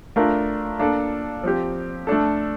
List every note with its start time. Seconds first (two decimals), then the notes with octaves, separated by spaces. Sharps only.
0.16 A3 D4 F4 A#4
0.79 A#3 D4 A4
1.43 F3 C4 G4
2.07 A3 D4 A4